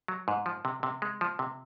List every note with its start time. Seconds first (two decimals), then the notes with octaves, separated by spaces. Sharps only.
0.08 F#3
0.28 G#2
0.46 F3
0.65 C3
0.83 C3
1.02 G#3
1.21 F3
1.39 C3